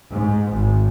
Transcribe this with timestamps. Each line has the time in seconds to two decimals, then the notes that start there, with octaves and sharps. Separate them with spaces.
0.10 G#2
0.51 G#1